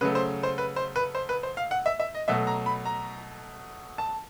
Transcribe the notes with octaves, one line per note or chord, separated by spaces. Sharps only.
C#3 F#3 A3 B4
C5
C5
B4
C5
B4
C5
B4
C5
F5
F#5
E5
E5
D#5
B2 F#3 A3 E5
A#5
B5
A#5
A5